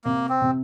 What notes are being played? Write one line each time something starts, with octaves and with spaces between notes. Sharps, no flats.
C3 A#3
C4
C3